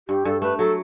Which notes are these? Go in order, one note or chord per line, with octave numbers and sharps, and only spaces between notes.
G2 G4
G2 A4
A3 B4
F#3 A4